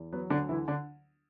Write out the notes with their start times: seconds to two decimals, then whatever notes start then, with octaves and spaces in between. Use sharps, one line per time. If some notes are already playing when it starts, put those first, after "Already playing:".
Already playing: E2
0.13 F#3 B3
0.30 D2 D3 D4
0.49 D3 E3 E4
0.68 D3 D4